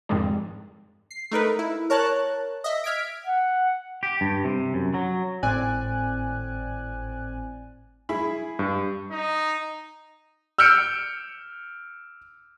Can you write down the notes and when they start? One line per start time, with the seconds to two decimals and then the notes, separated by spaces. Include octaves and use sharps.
0.09 F2 G#2 D#3 G3 G#3 D4
1.11 C7
1.31 A3 D#4 A#4 B4
1.59 E4
1.90 A#4 C#5 A5 F#6
2.64 D#5 E5
2.84 E5 F6 G#6 B6 D7
3.26 F#5
4.03 G4
4.21 G2
4.44 C3
4.74 F#2
4.94 F#3
5.43 G#1 A2 C4 D5 G#5 F#6
8.09 E4 G#4 B5
8.59 G2
9.11 D#4
10.58 E6 F6 G6 C#7 D7